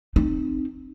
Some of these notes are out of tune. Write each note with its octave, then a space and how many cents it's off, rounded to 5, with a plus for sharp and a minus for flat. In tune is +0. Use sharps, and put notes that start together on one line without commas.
C4 +0 D#4 -25